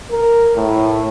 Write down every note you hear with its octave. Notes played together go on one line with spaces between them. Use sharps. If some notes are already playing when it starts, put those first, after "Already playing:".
A#4
A2